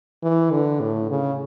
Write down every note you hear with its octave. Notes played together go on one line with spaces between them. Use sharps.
E3
D3
A2
C#3